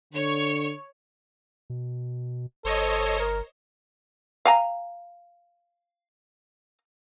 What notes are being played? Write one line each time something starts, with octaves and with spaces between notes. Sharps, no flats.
D3 C#5
B2
G1 A4 C5 C#5 D#5
A#4
F5 G#5 A#5